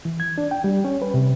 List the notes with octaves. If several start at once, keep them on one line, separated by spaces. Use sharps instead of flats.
E3
G#6
D4
G5
G3
C#4
B4
C3